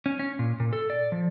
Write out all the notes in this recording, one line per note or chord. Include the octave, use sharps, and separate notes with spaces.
C#4
C#4
A#2
A#2
A4
D5
F3